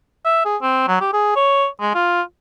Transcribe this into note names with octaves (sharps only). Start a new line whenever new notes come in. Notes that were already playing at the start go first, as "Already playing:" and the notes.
E5
G#4
C4
F#3
G4
G#4
C#5
G#3
F4